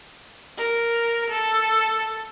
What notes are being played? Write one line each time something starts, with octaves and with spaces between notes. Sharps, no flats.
A#4
A4